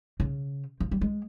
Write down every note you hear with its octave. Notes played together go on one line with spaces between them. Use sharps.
C#3
F3
G3
G#3